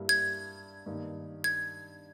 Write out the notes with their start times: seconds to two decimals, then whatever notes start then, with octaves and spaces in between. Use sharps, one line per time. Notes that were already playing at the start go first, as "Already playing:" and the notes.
Already playing: G2 G3 A#3 E4
0.09 G#6
0.86 G2 D#3 A#3 D#4
1.44 G#6